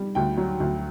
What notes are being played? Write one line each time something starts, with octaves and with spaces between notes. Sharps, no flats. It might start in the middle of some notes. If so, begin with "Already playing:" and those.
Already playing: G3
D2 G5
F#3
D2